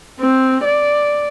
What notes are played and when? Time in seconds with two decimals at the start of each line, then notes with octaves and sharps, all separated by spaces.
0.20 C4
0.64 D5